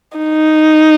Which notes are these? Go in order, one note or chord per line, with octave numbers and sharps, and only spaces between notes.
D#4